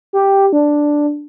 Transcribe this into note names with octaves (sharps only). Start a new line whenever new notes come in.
G4
D4